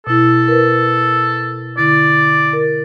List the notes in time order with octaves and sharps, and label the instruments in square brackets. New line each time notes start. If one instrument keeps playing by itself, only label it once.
[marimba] B2 E4 [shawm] A4
[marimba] A#4 B4
[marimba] D3 E4 [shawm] D5
[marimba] A#4